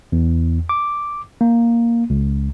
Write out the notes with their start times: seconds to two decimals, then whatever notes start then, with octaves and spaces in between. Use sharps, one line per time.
0.12 E2
0.69 D6
1.41 A#3
2.10 C#2